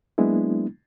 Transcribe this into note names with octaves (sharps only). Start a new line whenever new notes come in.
F#3 G#3 A#3 B3 D4 E4